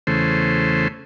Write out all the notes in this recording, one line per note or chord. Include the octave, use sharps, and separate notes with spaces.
E2 C#3 A3 C5